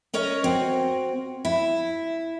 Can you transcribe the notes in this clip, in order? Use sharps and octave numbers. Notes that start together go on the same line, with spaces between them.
C#4 A#4 C#5 D#5
C4 F#4
E4